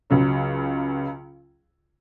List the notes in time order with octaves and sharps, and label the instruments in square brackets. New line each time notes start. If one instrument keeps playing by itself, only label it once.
[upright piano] C#2 C#3 F#3